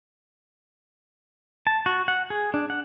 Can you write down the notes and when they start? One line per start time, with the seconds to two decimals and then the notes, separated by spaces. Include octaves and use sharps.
1.67 A5
1.86 F#4
2.08 F#5
2.30 G#4
2.54 D4
2.70 F#5